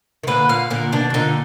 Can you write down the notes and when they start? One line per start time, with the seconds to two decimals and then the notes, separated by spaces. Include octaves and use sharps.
0.23 D#3
0.27 A#2 D3 B4
0.49 A#2 F5
0.70 A#2 D3 A#4
0.92 B2 D#3 D4
1.10 B2
1.14 A#2 D3 D#4